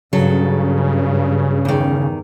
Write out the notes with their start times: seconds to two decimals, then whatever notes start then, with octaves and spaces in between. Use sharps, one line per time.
0.13 G2 C#3 F#3 A4
1.65 E2 D#3